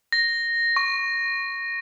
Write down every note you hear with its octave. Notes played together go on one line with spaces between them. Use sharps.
A#6
C#6